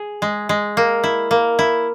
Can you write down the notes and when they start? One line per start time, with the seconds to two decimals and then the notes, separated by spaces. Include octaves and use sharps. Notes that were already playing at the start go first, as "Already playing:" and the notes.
Already playing: G#4
0.22 G#3
0.49 G#3
0.77 A#3
1.04 E4
1.31 A#3
1.59 E4